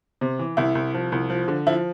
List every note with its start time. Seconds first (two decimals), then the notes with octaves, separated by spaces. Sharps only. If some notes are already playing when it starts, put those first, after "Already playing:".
0.21 C3
0.39 E3
0.57 C2 E4
0.75 C2
0.94 F3
1.12 C2
1.30 F3
1.48 D3
1.67 F3 E4